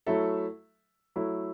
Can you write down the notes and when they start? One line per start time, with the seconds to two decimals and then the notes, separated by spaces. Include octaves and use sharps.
0.07 F#3 A3 E4 A4 E5
1.16 F#3 A3 E4